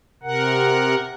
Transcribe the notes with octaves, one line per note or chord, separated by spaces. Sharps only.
C3 A#4 F#5